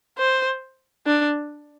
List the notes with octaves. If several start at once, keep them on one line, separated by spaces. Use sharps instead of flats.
C5
D4